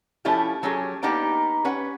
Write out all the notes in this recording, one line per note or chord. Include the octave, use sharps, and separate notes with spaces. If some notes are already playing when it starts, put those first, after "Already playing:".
F3 A3 C#4 E4 F4 G4
F#3 A3 C#4 G4 G#4
A#3 B3 D4 D#4 G4 G5
C#4 B4 F#5